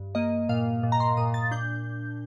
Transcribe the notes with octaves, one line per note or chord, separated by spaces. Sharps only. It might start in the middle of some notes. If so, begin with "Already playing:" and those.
Already playing: G2
A#3 D#5
A#2 F5
A#2
A#5
C6
A#2 D#6
A6
D4 G6